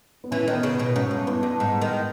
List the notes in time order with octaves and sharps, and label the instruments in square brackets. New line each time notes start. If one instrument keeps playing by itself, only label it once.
[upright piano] B3
[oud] E3 [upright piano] C#4
[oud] D#3
[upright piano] B3
[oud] C#3
[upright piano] B3
[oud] B2
[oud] G#2 [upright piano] C#4
[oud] G2
[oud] E2 [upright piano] B3
[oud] G2
G#2
D#3